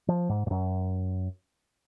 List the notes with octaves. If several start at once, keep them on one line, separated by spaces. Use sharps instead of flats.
F3
G#2
G#2
F#2